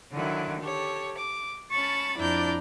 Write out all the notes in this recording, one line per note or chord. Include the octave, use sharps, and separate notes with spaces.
D3 D#3 F#3 E4
G4 A4 C#5
D6
C#4 A5 B5 C#6 A6
F2 D4 E4 D5 A#5 G6